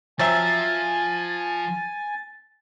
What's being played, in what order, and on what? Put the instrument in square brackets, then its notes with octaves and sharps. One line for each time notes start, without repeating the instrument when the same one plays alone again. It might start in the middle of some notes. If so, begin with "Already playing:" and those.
[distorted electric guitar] F3 [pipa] F#3 C4 E5 [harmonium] G#5 [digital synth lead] A6